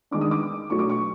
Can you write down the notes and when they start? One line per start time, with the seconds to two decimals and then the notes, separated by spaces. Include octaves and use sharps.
0.11 D#3 G#3 B3 D4 D6
0.21 D#6
0.31 D6
0.70 B2 F#3 A3 D4 C#6
0.79 D6
0.90 C#6